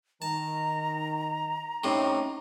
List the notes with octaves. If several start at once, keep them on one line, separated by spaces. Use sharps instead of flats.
D#3 A5 A#5
A2 C3 A3 C#4 D#4